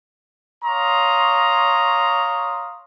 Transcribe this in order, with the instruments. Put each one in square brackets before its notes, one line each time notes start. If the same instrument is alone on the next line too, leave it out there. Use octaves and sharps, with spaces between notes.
[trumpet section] C#5 F5 A#5 C6 C#6 D#6